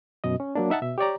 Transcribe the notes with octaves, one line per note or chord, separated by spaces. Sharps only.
F#2 B2 D#5
C#4
F#3 A#3 D4
D#4 E5 F#5 A5
B2 E5
G4 C#5 D5 A#5